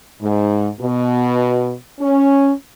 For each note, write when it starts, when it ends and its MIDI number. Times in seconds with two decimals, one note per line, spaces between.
0.21 0.68 44
0.79 1.73 47
1.99 2.50 61